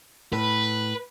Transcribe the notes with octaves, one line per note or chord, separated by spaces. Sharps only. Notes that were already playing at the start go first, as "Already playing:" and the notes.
A2 B4